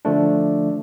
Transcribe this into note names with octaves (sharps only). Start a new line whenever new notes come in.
D3 F3 A3 D4